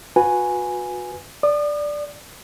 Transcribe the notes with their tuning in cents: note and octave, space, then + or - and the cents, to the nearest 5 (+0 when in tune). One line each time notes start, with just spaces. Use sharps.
F#4 -35 B4 -5 G#5 +0
D5 +0 D#6 -40